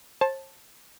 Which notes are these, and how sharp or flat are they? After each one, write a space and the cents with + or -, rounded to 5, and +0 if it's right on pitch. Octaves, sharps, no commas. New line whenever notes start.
C5 +40 A5 +0